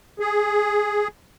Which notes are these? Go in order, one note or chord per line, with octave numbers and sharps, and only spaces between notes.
G#4